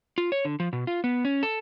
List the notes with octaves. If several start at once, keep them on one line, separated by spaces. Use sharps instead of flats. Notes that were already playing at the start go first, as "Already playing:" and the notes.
F4
C#5
D3
F3
B2
F4
B3
C#4
A4